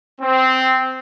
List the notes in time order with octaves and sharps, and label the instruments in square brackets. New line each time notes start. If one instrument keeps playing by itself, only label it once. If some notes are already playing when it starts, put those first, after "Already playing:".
[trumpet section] C4